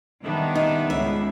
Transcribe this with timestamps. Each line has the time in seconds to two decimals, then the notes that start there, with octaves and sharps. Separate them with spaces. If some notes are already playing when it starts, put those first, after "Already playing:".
0.24 D#3 G3 B3 D4 D#5 E5
0.55 D#4
0.90 C#2 G#2 C#4 E5